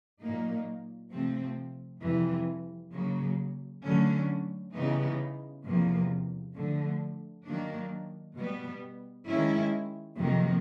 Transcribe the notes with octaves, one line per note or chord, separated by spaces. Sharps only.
A#2 F#3 A#3 D#4
C3 F3 A3 C4
F2 C3 E3 G3
C#3 F#3 A#3
D3 F#3 A3 C#4
C#3 E3 G3 B3 D#4
E2 C3 F3 A#3
D3 F3 A3
D#3 F#3 A#3 D4
B2 G3 B3
D#3 G#3 C#4 E4
F2 C3 D#3 F#3 A#3